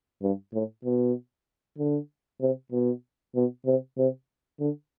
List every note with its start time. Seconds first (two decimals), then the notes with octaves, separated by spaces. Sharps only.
0.22 G2
0.53 A2
0.84 B2
1.78 D3
2.41 C3
2.72 B2
3.35 B2
3.66 C3
3.98 C3
4.60 D3